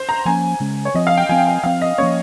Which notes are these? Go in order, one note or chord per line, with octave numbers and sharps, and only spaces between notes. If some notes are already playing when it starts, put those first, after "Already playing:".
Already playing: C5
A#5
F3 A#3 C#4 G#5
C#3 G#3 C#4
C#5
F3 C4 D#5
F5
G5
F3 C4 G#5
G5
F3 C4 F5
D#5
F3 A#3 C#4 C#5